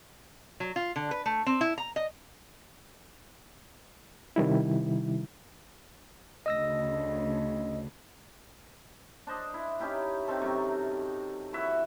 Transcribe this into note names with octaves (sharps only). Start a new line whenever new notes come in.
F#3
F4
D3
B4
A3
C4
E4
A#5
D#5
C3 D#3 G3 E4
D2 C#3 D#5 E6 A#6
D4 C5 D#5
E4
C#4 D#4 E4 G4
D#3 C4 A4
F#2 C3 C#6
E3 E4 F#4 E5